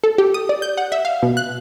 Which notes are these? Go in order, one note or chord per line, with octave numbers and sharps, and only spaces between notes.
A4
G4
D#6
D5
G6
F#5
E5
F5
B2
F#6